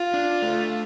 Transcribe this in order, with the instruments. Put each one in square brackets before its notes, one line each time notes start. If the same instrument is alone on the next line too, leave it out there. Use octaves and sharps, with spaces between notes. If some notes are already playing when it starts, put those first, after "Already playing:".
Already playing: [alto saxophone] F4
[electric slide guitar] D4
A3